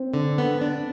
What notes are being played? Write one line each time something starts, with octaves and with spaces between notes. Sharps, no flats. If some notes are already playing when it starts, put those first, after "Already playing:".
Already playing: C4
D3
B3
D4